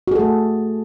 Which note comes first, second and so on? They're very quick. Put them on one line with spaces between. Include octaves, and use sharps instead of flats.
F#4 G#4 A4 A3